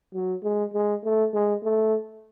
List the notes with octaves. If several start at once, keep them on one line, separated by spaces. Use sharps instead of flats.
F#3
G#3
G#3
A3
G#3
A3